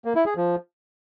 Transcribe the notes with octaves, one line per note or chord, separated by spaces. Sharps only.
A#3
E4
G#4
F3